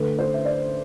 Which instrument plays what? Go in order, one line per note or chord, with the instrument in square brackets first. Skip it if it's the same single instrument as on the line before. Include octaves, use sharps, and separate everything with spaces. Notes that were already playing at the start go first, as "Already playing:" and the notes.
Already playing: [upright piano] D3 A3 B4
C5
E5
D5